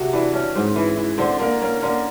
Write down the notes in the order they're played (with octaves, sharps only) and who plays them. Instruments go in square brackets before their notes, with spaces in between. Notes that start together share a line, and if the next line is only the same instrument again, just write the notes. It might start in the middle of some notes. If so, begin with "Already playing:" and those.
Already playing: [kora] C3 F#4
[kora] E3 [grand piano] D4
[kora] C#4 [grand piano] D4
[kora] G#2 [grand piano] C4
[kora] E3
E3
[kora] D3 [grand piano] C4
[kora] D3 [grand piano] A#3
[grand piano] A#3 [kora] C#4
[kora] D3 [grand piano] A#3